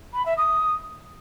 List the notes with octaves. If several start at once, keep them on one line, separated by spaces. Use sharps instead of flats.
B5
E5
D#6